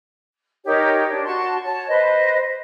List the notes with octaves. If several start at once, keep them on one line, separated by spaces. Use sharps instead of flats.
D#4 G4 A#4 C#5
D4
F#4 A5 C6 C#6
C#5 A5
B4 C5 D#5